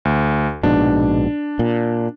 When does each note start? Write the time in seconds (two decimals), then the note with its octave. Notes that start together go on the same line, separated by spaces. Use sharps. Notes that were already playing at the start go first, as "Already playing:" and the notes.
0.05 D2
0.63 A#1 G#2 B2 D4
1.59 A#2